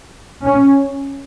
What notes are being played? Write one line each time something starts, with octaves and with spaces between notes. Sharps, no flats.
C#4